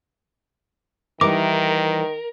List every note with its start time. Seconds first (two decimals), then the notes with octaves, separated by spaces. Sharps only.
1.21 D#3 E3 G3 D#4 A#4 D6